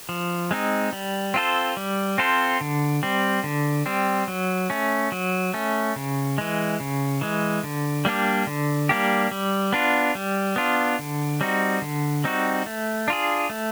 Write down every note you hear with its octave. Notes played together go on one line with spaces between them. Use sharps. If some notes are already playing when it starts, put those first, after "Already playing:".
F3
G#3 C4 D#4
G3
C4 F4 A4 C5
G3
C4 F4 A4 C5
D3
G3 C4
D3
G3 C4
F#3
A3 C#4
F#3
A3 C#4
C#3
E3 G#3
C#3
E3 G#3
D3
G3 A#3 D4 G4
D3
G3 A#3 D4 G4
G3
B3 D4 F4
G3
B3 D4 F4
D3
G3 C4 D#4 F#4
D3
G3 C4 D#4 F#4
A3
D4 F4 G#4
A3